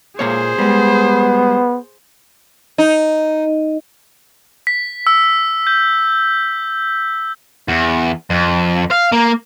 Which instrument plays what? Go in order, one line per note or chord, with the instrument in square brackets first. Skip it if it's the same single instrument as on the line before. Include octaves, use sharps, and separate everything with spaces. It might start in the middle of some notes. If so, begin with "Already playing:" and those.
[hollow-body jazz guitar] A#2 A#3 C#5 [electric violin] G#4 C5
[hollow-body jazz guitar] G3 G#3 [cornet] B3
[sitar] D#4
[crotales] B6
E6
G6
[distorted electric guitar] E2
F2
F5
A#3